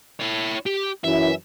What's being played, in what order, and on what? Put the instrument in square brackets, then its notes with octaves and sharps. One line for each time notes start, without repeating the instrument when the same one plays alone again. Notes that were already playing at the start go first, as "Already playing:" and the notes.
[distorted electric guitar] E4 C#5
G4
[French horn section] F#2 E3 [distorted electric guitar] E5